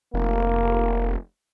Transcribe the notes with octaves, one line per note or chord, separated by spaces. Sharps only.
F1 A#3